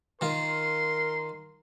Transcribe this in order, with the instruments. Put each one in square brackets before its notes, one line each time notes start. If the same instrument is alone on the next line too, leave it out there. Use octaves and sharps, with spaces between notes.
[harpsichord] D#3 F4 [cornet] A#4 [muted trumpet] C6